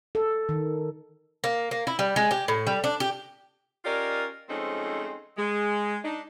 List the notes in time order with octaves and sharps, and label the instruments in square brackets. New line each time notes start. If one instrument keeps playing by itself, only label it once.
[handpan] A4
D#3
[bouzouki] A#3
A#3
E4
G3
G#3
G4
A2
G3
D4
G4
[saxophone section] C#4 F4 G4 A#4 D5 D#5
F3 G#3 A3 C4 C#4 D#4
G#3
D4 D#4